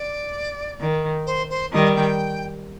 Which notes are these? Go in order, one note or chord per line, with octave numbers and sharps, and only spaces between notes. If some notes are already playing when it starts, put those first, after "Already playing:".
Already playing: D5
D#3
C5
C5
D#3 G3 D#5
G5